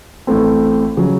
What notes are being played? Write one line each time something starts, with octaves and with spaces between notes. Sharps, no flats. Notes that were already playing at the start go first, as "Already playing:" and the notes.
A1 A2 A3 C4
C#3 F#3